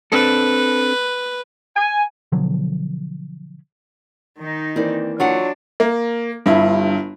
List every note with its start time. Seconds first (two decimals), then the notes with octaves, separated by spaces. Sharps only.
0.12 C4 D4 A4 B4
1.76 G#5
2.32 B2 D3 F3 F#3
4.39 D#3 D#4
4.76 E3 A#3 C4 D5
5.20 F#3 D4 F4 F#4 F#5
5.80 A#3
6.46 G1 G2 E4